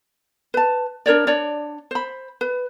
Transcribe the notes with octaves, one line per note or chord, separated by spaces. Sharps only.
B4 A5
D4 A#4 C#5 D5
D4 C#5 D5
C5 B5
B4